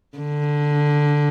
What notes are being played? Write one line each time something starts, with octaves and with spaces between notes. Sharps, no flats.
D3